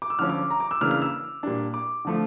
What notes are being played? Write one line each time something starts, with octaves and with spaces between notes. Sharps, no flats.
D6
E6
D3 F3 C#4 F6
D6
A#5
D6
E6
C#3 E3 A#3 D4 F6
F6
E6
A#2 G3 D4
D6
D3 F3 A3